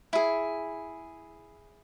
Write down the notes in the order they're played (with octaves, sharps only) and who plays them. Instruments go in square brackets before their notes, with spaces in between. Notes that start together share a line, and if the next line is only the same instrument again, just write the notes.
[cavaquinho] E4 G#4